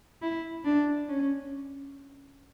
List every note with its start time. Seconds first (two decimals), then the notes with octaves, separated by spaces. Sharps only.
0.22 E4
0.65 D4
1.09 C#4